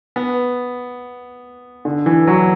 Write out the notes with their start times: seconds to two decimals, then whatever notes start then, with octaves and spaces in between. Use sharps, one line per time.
0.16 B3
1.85 D3
2.06 E3
2.27 F#3